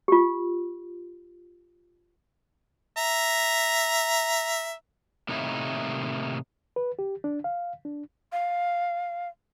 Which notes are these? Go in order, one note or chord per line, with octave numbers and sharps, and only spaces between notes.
F4 G4
E5 A#5
A2 C3 D#3 A#3 D#4 E4
B4
G4
D4
F5
D4
F5